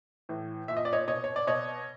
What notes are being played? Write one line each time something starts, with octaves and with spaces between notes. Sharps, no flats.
A2 E3
A#2 E5
D#5
D5
C#5 D#5
B2 C#5 D#5
C#5
D5
B2 C#5 D#5